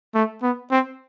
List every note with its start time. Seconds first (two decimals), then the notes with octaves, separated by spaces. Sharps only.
0.15 A3
0.43 B3
0.71 C4